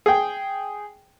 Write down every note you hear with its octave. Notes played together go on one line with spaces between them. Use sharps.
G#4 G5